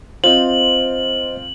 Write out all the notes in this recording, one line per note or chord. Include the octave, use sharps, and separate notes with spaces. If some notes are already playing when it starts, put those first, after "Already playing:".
C4 F4 C5 D#5 F#7